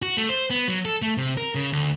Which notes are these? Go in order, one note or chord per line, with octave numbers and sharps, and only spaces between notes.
F#4
A3
C5
B3
F#3
A4
A3
C3
A#4
C#3
D2